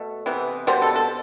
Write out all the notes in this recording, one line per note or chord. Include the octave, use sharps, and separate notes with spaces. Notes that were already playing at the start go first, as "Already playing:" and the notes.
Already playing: B2 A3
C3 E3 B3
B2 G3 B3 C5
A4
A4